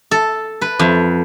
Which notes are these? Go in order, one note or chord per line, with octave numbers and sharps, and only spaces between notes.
A4
B4
F2